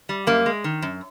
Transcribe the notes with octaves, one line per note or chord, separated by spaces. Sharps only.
G3
F#2 A#3
G#3
D#3
F#2